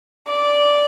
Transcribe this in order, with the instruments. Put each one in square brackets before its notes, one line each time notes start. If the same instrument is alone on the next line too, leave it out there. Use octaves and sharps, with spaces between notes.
[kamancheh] D5